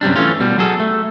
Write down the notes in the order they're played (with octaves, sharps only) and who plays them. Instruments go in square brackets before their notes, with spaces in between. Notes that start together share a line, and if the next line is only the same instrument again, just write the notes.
[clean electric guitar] F#2 C3 G3 D4
E3 A3 C#4 F4
B2 G3
F#3 G#4 A4
A3